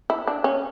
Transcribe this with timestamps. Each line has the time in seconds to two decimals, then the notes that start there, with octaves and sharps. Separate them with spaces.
0.10 E4
0.27 D4
0.44 C#4